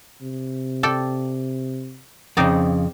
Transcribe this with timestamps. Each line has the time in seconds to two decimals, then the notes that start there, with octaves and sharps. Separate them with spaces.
0.21 C3
0.83 A4 D5 G5
2.37 F2 C#3 C4 D#4 D5